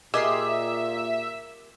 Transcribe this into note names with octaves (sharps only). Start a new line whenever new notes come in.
A#2 G4 G#4 A#4 D#5 E5 C6